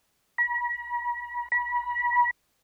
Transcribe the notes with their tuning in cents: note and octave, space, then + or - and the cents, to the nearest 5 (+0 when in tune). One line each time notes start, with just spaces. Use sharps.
B5 -45
B5 -35